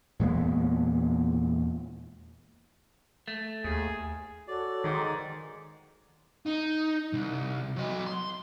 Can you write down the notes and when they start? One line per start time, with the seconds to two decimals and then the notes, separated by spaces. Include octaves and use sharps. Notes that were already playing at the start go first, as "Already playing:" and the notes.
0.19 E2 A#2 G#3 B3
3.28 A3
3.64 D#2 G#4
4.47 F#4 A4 C#5 D5
4.84 G#2 D#3
6.46 D#4
7.13 C2
7.77 F#3 D#5
8.06 C6